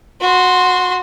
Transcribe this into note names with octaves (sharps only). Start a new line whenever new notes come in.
F#4 C6